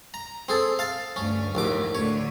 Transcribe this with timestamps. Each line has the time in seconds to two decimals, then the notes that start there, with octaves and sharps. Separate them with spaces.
0.14 A#5
0.49 C4 G#4 A4
0.79 F5 A5
1.16 D2 G2 C#4
1.55 A#1 D#2 A2 D6
1.95 D2 D3 C#5